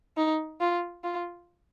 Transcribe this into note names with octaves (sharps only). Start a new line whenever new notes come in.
D#4
F4
F4